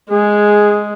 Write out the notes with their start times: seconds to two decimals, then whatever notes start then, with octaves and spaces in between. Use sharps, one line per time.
0.10 G#3 G#4